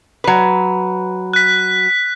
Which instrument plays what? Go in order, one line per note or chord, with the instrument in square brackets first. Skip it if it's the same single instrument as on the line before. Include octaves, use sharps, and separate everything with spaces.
[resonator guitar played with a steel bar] F#3 B4
[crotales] F#6 B6